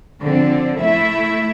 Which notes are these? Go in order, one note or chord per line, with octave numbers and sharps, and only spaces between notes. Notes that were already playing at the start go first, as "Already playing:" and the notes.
D3 F3 C4
A3 E4 E5